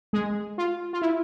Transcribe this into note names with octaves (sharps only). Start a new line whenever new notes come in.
G#3 G#4
F4
F4
E4